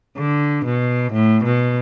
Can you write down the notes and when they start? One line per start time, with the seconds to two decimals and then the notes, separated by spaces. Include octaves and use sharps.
0.18 D3
0.65 B2
1.12 A2
1.44 B2